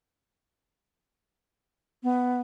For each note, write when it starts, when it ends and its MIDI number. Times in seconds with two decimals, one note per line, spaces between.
2.03 2.41 59